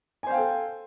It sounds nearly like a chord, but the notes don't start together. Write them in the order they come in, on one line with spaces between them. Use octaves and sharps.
G#5 C5 F5 G5 A4